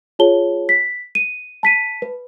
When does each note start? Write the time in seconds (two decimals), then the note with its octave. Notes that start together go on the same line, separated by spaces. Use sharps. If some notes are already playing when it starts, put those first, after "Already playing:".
0.19 F4 G#4 C#5 A5 G7
0.69 B6
1.15 D#7
1.63 A5 B6 D#7
2.02 B4